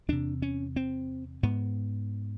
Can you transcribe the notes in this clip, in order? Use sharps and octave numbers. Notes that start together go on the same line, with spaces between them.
E2 C3 D4
C#4
C4
G#2 B3